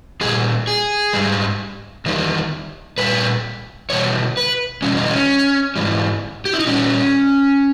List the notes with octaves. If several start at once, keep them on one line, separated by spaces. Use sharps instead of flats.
A#2 G3 G#4
G#4
G#2 G3
E2 D#3 G3
A#2 G3 B4
E2 B2 G3 C#5
B4
E2 B2 G3 C#4
D#4
C#4
G#2 E3 G3
G4
E4
D#4
A#2 G3 C#4